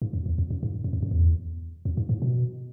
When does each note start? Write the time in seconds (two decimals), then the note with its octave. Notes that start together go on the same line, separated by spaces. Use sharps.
0.02 G#2
0.13 F2
0.26 E2
0.38 F2
0.50 F#2
0.63 G#2
0.84 F#2
0.93 F2
1.02 F#2
1.11 E2
1.85 F2
1.97 G#2
2.09 A2
2.22 B2